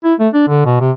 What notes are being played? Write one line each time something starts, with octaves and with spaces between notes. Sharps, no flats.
E4
A3
D4
D3
B2
C3